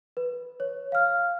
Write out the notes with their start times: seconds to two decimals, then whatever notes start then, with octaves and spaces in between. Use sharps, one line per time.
0.17 B4
0.60 C#5
0.92 F5 F6